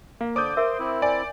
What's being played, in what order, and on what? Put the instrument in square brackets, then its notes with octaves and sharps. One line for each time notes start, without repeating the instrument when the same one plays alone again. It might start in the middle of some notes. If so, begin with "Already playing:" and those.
[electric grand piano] A#3 [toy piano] F5
[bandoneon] D3 D5 [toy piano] C5 [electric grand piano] D6 D#6 G6
[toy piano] A#4 E5 E6 [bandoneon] C5 C6
[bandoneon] C4 E4
[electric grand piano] D5 [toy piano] G#5